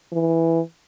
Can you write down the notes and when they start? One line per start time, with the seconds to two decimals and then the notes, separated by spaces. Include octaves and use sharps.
0.12 E3